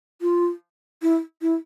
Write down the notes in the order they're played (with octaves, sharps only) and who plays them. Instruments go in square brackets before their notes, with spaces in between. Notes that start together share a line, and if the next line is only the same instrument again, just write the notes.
[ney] F4
E4
E4